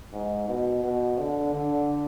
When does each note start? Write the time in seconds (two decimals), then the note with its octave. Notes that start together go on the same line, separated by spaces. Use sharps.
0.13 G#2
0.48 B2
0.84 B2
1.18 D3
1.54 D3